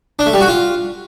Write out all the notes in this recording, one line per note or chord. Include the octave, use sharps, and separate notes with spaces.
D4
A3
G3
F#4
F4